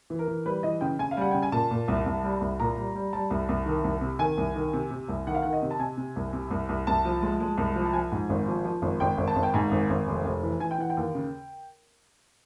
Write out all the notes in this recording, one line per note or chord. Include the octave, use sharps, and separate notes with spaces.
E3
A#4
E3
G3 B4
E3 D#5
C#3 G5
C#3 G#5
F5
G3 F#5
C#3 G5
G#5
A#2 A5
A#2
C2
C2
G3
C2
A#2 A#5
G3
G3
G3 A5
C2
C2
D#3
C2
C3
D#3 G#5
C2
D#3
C3
C3
C2
D#3 F#5
F5
D#3 F#5
D#5
C3
A5
C3 G#5
C3
C2
C3
C2
C2
C2 A5
F3
G#3
G#3
C2
F3
A5
F3 G#5
G#2
G#1
F3
F3
G#1
G#1 G5
G#1
A5
G#1
G5
G#2 G#5
G#1
G#1
F1
F1
E3
E3 G#5
G5
E3 F#5
G5
D#2
C#3